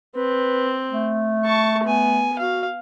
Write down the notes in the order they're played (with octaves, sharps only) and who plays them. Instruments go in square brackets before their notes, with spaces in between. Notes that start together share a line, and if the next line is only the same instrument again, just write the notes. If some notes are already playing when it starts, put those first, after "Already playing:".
[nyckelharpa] C4 [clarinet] B4
[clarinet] A3
[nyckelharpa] A5 C#6
B3 G#5
[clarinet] F#4 [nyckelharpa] F5